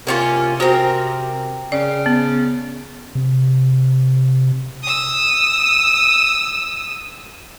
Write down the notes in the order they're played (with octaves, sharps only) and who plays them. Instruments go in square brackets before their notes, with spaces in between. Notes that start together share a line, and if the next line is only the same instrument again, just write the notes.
[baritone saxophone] C3 [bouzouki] A#3 C#4 F4
[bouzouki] C4 A#4 [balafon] F#4 C5
[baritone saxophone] C#3 [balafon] D5
[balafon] B3
[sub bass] C3
[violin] D#6 E6